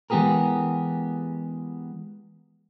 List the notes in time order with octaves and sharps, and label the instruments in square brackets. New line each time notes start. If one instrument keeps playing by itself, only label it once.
[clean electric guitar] E3 G#3 B3 G4 G#4 A#4